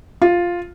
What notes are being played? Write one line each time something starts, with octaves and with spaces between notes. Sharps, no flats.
F4